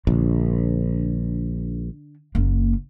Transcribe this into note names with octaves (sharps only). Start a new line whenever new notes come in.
A#1 D3
F#1 A#3